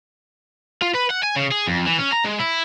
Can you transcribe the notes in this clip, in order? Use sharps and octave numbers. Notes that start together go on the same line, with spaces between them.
F4
B4
F#5
G#5
C#3
G#4
F2
E3
C#4
A#5
G#3
E4